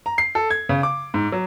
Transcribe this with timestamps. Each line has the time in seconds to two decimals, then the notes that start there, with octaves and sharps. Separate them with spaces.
0.06 A#5
0.18 C7
0.35 A4
0.51 G#6
0.69 C#3
0.83 D6
1.14 G#2
1.32 F#3